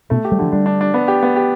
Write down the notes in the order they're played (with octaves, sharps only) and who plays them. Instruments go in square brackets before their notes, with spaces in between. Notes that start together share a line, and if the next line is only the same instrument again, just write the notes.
[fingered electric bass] B2 [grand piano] A3
[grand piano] G4
[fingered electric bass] G3
[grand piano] D3 [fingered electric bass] F3
[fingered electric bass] G3 [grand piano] D4
[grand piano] D4
D4
B3
G4
B3
G4